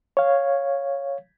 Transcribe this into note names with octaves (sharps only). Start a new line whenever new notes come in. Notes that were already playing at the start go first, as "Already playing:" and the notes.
C#5 F5